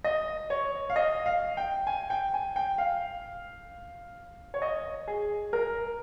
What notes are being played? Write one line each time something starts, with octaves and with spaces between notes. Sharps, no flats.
D#5
C#5
F5
D#5
F5
G5
G#5
G5
G#5
G5
F5
C#5
D#5
G#4
A#4